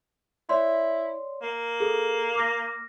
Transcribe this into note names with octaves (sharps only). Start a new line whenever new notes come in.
E4 C#5 D5 C6
A#3
G#4 A4
D6 F6 A#6